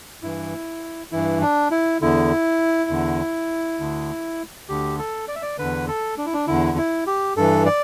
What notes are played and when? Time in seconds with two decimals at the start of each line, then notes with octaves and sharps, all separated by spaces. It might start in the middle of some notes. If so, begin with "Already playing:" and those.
0.23 G2 E3 E4
1.12 G2 E3 E4
1.42 D4
1.71 E4
2.01 E2 D3 E4
2.90 E2 D3
3.80 D2 D3
4.69 D2 D3 G4
4.98 A4
5.28 D5
5.35 E5
5.42 D5
5.58 E2 D3 B4
5.88 A4
6.18 D4
6.26 E4
6.34 D4
6.47 E2 D3 E4
6.77 E4
7.07 G4
7.37 G2 E3 A4
7.66 D5